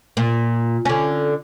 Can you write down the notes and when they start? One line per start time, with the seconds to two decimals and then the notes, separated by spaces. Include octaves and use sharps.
0.17 A#2
0.85 D3 C#4